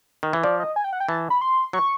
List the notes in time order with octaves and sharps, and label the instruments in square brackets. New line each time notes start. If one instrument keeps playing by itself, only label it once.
[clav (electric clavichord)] D#3
E3
[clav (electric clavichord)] F3 [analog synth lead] D5
[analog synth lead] D#5
G#5
G5
F#5
G5
[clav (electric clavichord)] E3 [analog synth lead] A5
[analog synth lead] B5
C6
[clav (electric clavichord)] F#3 [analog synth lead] C#6